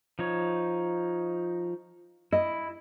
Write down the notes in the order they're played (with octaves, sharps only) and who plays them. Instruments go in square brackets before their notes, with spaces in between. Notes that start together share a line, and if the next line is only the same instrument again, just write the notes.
[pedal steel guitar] F3 D#4 C#5
[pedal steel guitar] E4 [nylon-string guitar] D#5